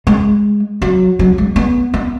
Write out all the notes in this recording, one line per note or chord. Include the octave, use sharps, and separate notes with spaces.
G#3
F#3
F#3
G#3
B3
B3